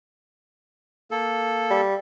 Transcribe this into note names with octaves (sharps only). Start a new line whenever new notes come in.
A#3 A4
G3